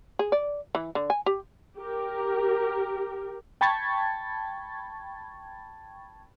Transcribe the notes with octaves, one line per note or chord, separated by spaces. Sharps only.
G#4
D5
E3
D3
G#5
G4
G4 A#4
G5 A5 B5 C#6 G#6 A6